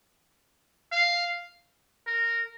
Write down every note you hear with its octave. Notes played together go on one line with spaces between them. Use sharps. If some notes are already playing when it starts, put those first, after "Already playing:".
F5
A#4